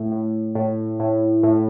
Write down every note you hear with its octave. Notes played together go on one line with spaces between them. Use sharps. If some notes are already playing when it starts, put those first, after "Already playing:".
Already playing: A2
A2
A2
A2
A2